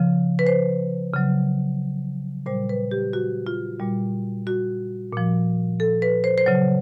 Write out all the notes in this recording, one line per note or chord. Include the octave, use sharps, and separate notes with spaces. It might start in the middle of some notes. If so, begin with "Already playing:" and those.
Already playing: C#3 F3
B4
C5
C#3 F#3
A#2 G3 C5
B4
G4
F#4
F4
A#2 G3
F#4
A#2 F3
A4
B4
C5
C5
C#3 F#3 C#5